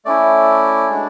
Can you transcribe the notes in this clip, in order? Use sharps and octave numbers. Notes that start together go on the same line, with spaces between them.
A3 C#4 E4 D5
G#3 D4 F#4